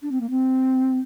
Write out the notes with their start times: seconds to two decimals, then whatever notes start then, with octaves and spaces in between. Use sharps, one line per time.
0.02 D4
0.11 C4
0.20 A#3
0.30 C4